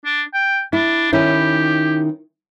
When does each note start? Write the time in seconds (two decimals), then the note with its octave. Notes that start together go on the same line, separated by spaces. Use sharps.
0.05 D4
0.33 G5
0.73 D4 E4
1.13 D#3 C#4 E4 G4